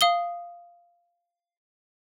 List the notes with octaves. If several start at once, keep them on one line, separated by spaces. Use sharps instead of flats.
F5 D#6 G7